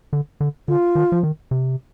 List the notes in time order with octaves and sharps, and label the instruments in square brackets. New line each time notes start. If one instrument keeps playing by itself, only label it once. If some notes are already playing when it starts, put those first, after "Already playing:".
[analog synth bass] D3
D3
[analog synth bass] D3 [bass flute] F4
[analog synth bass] D#3
F3
D#3
C3